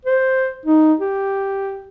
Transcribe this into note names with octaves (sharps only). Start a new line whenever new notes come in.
C5
D#4
G4